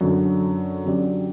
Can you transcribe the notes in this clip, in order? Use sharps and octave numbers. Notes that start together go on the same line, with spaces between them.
F#2 D3 F#3
D3 F#3 C#4 G4 D5